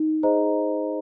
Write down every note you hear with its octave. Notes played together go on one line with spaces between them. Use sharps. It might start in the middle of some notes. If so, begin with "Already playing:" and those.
Already playing: D#4
G#4 C5 D#5 A#5